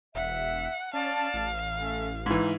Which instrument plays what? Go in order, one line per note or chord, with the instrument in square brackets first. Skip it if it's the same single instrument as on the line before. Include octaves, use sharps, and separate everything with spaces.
[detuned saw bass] E1 [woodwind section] E5 [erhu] F#5
[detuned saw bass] C#4 [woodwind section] D5 A5 [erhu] F5
[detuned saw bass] A1
[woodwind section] A3 C#4 A4
[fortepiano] G#2 E3 [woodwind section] A3 D#4 E4